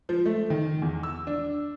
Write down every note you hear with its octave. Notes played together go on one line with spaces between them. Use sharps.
F3
A3
D#3
E2
E6
D4